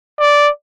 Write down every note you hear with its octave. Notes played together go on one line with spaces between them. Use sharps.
D5